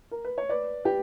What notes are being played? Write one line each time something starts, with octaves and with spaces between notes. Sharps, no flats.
A#4
B4
C#5
B4 D5
G4 B4